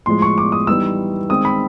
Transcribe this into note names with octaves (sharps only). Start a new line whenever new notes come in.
A2 F3 G#3 C6
C#6
D6
D#6
E3 G3 B3 D#4 E6
D#3 G#3 C4 D#4 D#6
B5